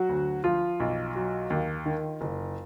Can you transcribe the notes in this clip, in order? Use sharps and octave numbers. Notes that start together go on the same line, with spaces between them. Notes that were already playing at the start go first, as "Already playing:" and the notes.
Already playing: F#3 F#4
D2
F3 F4
B1
F#3
D#2
D#3
F#1